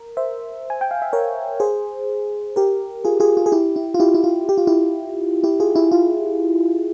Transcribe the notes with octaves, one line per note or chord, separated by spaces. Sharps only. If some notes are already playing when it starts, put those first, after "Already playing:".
Already playing: A#4
C5 E5
G#5
G5
F5
E5
A#4 C#5
G#4 C5
G4 A#4
F4 G#4
F4 G#4
F4
G#4
E4 G4
E4
F4
E4 G4
E4
F4
G4
F4
E4 G4
E4 G4
F4 G#4
E4 G4
F4